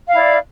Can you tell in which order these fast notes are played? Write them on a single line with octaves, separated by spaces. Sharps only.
F5 E4 D5